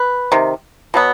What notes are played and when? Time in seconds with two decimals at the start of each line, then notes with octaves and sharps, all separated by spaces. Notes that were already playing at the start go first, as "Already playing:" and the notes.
Already playing: B4
0.32 C3 D#3
0.94 B2 F#3 B3